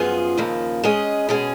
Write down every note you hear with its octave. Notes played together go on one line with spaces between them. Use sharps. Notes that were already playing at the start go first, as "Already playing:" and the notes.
Already playing: F#2 F3 B3 F4 G#4
D#2 C#3 F3 A#3
G#3 C#4 G#4 D#5
B2 G#3 C#4 G#4